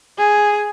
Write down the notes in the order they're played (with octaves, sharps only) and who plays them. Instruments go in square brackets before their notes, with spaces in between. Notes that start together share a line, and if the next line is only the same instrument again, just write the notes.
[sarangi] G#4